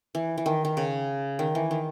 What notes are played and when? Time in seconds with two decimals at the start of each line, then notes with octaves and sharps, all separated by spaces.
0.15 E3
0.38 E3
0.46 D#3
0.65 D#3
0.77 C#3
1.39 D#3
1.55 E3
1.71 D#3